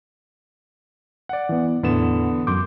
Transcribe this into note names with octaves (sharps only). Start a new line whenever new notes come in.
D5 F#5
E3 B3
E2 A2 D3 E3 B3 E7
F#2 C6 D6 G6